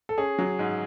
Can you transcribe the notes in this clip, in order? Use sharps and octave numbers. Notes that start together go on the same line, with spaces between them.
A4
C#4 G#4
F#3
G#2